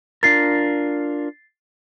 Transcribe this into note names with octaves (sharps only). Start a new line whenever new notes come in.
D4 F4 A#4 A6 C7